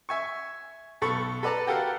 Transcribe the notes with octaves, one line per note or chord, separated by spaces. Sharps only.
E5 G#5 C#6
B1 A4 B5 C#6
A4 B4 D5 A5 A#5
F#4 G4 A4 A#4 F5 F#5